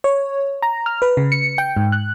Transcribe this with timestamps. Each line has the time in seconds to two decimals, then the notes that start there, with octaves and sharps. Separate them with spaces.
0.04 C#5
0.62 A#5
0.86 F6
1.02 B4
1.17 C#3
1.32 C#7
1.58 G5
1.77 G#2
1.92 F#6